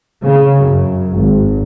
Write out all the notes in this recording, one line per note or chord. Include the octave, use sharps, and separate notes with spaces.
C#3
F#2
G#1